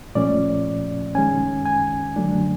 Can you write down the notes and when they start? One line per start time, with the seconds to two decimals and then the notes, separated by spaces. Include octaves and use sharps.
0.15 A#2 F3 A3 C#4 D5
1.15 D#3 G#3 C#4 G#5
1.66 G#5
2.16 D3 F#3 A3 D4